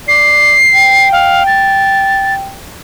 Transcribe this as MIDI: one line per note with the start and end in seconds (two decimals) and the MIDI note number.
0.08 0.56 74
0.08 1.08 96
0.74 2.52 79
1.12 1.43 77
1.47 2.34 93